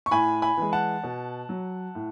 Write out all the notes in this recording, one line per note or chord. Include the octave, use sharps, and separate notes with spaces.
C#6
A2 G#5 B5
G#5 B5
E3 G#3
F#5 A5
B2
F#3
A2